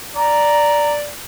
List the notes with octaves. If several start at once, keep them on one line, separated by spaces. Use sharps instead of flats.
D5 A#5